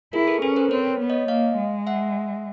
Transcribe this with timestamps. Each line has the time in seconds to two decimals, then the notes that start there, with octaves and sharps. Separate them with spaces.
0.13 E4 G#4 A#4
0.28 A4 B4
0.42 C#4 A4 B4
0.56 A#4 C5
0.71 C4 B4 C#5
1.00 B3
1.10 C#5 D#5
1.28 A#3 D#5 F5
1.58 G#3
1.87 E5 F#5